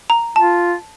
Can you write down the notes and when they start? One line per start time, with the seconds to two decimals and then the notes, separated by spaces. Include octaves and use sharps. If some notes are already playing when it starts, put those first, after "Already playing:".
0.10 A#5
0.36 F4 A5